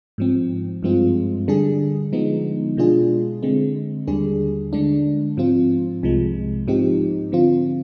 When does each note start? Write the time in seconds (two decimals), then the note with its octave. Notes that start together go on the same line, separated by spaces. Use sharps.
0.18 G#2 F3 C4
0.83 G2 F3 G#3 C4 F4
1.48 D3 G3 D4 G#4
2.12 D3 F3 G#3 B3 D#4
2.77 B2 G#3 D4 F4 G#4
3.42 D3 G#3 C4
4.07 D#2 D3 G3 D4 G#4
4.73 D3 G#3 D4
5.37 G#2 F3 C4 F4
6.03 C2 C3 F3 G#3
6.67 G#2 F3 C4 D#4 G4
7.32 D3 F3 C4 F4